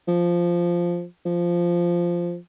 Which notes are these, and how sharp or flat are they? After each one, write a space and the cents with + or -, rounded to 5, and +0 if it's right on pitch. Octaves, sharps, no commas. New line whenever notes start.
F3 -5
F3 -5